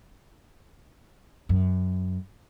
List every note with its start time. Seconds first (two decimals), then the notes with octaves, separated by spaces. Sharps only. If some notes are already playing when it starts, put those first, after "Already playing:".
1.49 F#2